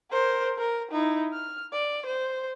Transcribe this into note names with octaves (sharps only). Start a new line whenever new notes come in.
A#4 C5
A#4
D#4 E4
F6
D5
C5